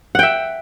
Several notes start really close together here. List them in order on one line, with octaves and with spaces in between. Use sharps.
F#5 G5 E5